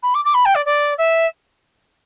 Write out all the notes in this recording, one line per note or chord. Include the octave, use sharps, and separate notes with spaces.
B5
D6
D6
B5
G5
D5
D5
E5